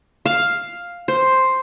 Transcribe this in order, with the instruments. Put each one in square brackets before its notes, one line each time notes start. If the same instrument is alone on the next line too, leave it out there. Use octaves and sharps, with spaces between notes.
[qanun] F5
C5